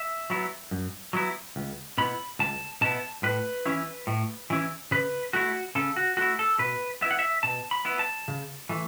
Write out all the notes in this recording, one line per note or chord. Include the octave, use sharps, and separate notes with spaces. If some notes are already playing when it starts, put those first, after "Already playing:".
Already playing: E5
F#3 B3 E4
F#2
F#3 B3 E4
C#2
B2 B3 E4 B5
C#2 A5
B2 B3 E4 A5
A2 B4
E3 C#4 E4
A2
E3 C#4 E4
C#3 B4
A3 E4 F#4
C#3 A4
F#4
A3 E4 F#4
A4
B2 B4
B3 E4 E5
F#5
E5
B2 A5
B5
B3 E4
A5
C#3
E3 A3